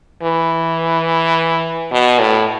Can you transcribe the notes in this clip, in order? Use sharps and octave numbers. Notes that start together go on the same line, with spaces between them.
E3
B2
A2